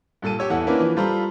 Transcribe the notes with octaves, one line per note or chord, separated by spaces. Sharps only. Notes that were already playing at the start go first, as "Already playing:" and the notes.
G2 A#2 A4 A5 D#7
G4 C#5 E6
E2 E4 A4 F#5
A#3 C#4 D4 E4 A#4 B4
E3 F3
G3 F4 A4 C5 A#5 B5